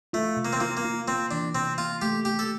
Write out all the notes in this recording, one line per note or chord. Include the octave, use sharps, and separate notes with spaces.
A3 F4
C3
A#3
C4
A#3 F4
A#3
F4
A#3 C4
E3 D4
C3 C4
A#3 F4
A3 G4
A3 G4
A4